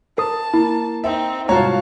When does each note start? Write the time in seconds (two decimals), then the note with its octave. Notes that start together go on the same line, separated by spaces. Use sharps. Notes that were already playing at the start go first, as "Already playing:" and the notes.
0.18 A#4 A5 D#6
0.54 A#3 E4
1.04 C4 D#4 E5
1.49 C2 G#2 F4 F#4 C#5 F5 A5 A#5